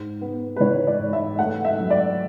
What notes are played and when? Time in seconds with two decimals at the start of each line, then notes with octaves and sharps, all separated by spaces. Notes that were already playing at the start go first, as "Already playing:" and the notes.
Already playing: G#2
0.21 B3
0.56 B4
0.60 E3 C#5
0.87 D5
0.99 G#2
1.13 E5
1.39 A3 F#5
1.65 E5
1.79 F#3
1.91 D5